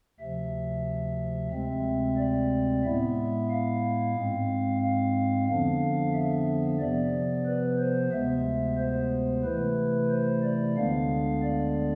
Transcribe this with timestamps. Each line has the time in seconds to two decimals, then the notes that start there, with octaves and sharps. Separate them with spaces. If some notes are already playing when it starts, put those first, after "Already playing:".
0.20 D2 C3 F3 E5
1.52 D2 C3 G#3 C4 E5
2.18 D5
2.84 A2 G#3 B3 E4 E5
3.50 F5
4.16 G#2 G#3 C4
4.82 F5
5.48 F2 D3 F3 B3 D4 F5
6.14 E5
6.80 C3 F3 B3 D5
7.46 B4
7.79 C5
8.12 D2 C3 G#3 B3 E5
8.78 C5
9.44 C3 E3 A3 E4 B4
10.10 C5
10.43 D5
10.77 D2 D3 G#3 B3 D4 F5
11.43 D5